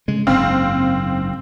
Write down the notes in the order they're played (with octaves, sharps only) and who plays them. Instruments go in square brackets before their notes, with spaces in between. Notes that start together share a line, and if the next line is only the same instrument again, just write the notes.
[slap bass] C#3 G#3
[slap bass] F#1 G#2 [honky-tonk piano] C4 F5